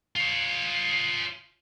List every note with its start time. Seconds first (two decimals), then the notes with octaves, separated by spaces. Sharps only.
0.16 F4 C#5